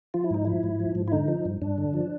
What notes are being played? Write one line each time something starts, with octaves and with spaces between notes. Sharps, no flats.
F3 F4
E4
G#2 D#4
F3 E4
G#2
F3
G#2
E4
D3 D#4
F3
G2
G2 D4
D3
F3